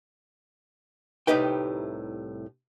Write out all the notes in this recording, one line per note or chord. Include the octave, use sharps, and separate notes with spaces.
C2 A2 D#4 G4 B4 G5